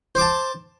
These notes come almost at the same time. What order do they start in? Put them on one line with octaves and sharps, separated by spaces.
C5 D6 A5